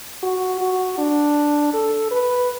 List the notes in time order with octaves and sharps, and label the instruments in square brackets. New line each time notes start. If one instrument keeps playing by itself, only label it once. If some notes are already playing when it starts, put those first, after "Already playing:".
[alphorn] F#4
F#4
D4
A4
B4